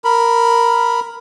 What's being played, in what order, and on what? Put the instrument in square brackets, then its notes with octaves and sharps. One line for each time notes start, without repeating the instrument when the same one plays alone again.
[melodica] A#4 B5